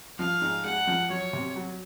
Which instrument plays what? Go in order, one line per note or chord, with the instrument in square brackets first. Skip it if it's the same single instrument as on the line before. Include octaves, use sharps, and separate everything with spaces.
[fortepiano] F3 [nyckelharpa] F5
[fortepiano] G#2
[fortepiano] G#3 [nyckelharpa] F#5
[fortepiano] F3
[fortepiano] F#3 [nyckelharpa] C#5
[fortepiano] C3
F#3